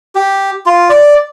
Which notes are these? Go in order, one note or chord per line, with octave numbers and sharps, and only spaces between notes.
G4
F4
D5